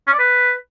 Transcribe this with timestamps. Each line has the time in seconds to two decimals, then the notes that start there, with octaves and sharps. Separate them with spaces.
0.07 C#4
0.13 D5
0.19 B4